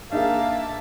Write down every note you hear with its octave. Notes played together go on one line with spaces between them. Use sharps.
A#3 D4 D#4 G#4 E5 F5 A5